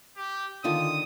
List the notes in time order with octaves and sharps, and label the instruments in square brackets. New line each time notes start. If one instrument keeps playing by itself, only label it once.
[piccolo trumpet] G4
[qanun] D3 D#3 F4 [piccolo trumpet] D#6